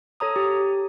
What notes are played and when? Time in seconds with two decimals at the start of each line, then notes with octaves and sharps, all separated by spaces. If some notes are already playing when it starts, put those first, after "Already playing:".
0.20 A4 C#5 A#5 D#6
0.36 G4